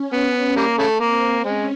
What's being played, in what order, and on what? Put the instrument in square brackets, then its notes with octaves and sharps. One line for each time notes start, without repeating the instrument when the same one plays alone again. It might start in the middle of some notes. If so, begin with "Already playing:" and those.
Already playing: [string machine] C#4
[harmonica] B3
G3 A#3
C#3 A3
[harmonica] A#3 [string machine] C4
[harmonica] G#3 [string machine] C#4